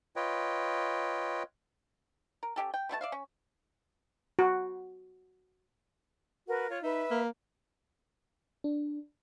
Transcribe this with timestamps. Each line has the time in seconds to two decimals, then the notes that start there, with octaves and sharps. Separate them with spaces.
0.16 F4 B4 C#5 D#5 G5
2.43 A#4
2.56 C#4 D4 G4 A4
2.74 G5
2.89 B2 A3 E4 A5
3.01 D5 E5 F5
3.12 C#4
4.39 F#4
6.47 F#4 A#4 B4
6.69 F4 C#5
6.82 D#4 B4 E5
7.11 A#3
8.64 D4